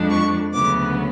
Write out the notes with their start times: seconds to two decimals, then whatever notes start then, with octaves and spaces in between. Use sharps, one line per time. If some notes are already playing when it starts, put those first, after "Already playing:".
Already playing: F2 F3 G#3 D4
0.10 C#6
0.53 D2 C#3 F#3 B3 D6